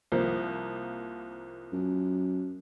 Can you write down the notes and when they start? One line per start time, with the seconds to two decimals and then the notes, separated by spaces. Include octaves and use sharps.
0.12 C2 F3 A#3
1.73 F#2